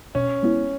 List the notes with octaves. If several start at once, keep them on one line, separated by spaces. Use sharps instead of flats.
B2 C#4
G#3 B3 E4